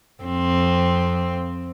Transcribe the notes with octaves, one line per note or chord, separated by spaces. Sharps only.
F2 C4